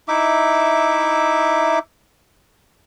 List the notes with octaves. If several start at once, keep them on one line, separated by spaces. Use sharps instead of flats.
D#4 E4 E5 D6